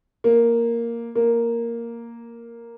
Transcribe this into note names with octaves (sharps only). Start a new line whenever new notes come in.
A#3
A#3